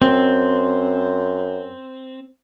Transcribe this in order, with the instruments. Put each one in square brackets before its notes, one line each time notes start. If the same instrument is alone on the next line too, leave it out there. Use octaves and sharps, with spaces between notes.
[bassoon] F#2 [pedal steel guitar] C4